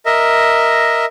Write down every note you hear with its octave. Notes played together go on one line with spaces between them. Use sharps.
A#4 D#5 E5